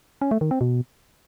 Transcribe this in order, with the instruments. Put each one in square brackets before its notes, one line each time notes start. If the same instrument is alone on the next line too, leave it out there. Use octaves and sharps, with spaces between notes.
[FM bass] C#4
A3
D#3
C4
B2